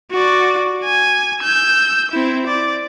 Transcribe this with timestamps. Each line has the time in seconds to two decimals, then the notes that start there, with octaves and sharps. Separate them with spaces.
0.11 F#4 D5
0.84 G#5
1.42 E6 G6
2.12 C4 E4
2.47 D5